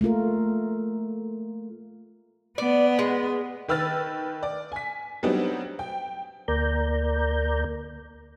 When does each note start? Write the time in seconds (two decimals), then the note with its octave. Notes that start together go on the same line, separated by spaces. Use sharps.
0.01 A3 A#3 F4 A#4
2.58 B3 D5
2.99 G#3
3.69 D#3 B4 E6 F6 A6
4.43 D5
4.72 G#5 B6
5.23 F#3 G3 B3 C4 D4 D#4
5.79 G5
6.48 D2 A#3 A#4 D5 A#5 G6